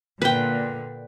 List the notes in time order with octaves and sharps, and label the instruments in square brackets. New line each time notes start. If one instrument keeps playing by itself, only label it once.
[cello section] A#2 D3 [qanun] B4 G5